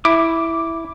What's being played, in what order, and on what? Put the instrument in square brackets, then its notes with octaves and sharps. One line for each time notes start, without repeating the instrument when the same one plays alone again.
[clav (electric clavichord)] E4 [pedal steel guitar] D6